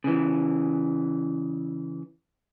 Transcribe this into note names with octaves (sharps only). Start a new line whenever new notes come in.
C#3 E3